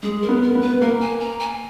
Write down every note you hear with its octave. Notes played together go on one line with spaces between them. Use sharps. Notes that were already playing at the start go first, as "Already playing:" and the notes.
G#3 G#4
A#4
B3
A#4
B3
B4
A#3 A#4
G#5
A#5
G#5